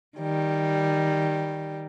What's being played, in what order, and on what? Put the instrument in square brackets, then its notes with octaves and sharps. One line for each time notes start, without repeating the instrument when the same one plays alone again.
[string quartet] D#3 G3